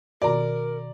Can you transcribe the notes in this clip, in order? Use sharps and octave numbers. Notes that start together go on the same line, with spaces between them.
B2 D#3 F#4 A#4 D5 A#5